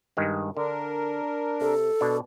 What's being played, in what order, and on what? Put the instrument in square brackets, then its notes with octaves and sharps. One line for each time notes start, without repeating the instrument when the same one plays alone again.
[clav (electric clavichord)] G2 D#3 G#3
[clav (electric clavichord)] D3 [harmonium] D4 A#4
[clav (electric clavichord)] C3 [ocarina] A4
[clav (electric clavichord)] B2 D4